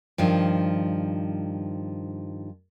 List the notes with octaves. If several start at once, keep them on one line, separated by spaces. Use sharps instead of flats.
G2 D#3 F3